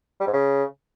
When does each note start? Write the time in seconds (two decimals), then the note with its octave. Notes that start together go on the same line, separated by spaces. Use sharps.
0.21 G3
0.27 G#2
0.33 C#3